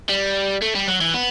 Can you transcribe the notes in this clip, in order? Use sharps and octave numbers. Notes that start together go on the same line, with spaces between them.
G3
A3
G3
F#3
E3
B3